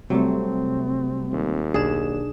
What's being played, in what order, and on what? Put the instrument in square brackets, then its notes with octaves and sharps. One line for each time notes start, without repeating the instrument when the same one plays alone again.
[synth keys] C3 G3 A3 [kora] F#3 [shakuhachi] C4
[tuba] D#2
[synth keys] B1 D4 E7 [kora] G#4